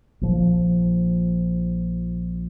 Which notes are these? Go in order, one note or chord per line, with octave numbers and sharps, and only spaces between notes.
A#1 F3